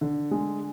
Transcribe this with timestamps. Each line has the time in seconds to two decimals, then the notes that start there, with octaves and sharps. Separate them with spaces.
0.01 D3
0.31 G#3